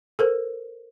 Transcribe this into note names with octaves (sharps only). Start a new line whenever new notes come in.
A4 A#4 C5